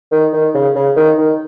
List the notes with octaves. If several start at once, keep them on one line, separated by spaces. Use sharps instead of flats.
D#3
D#3
C#3
C#3
D#3
D#3